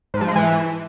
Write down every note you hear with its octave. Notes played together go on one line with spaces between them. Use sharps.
G#2
F3
G#3
E3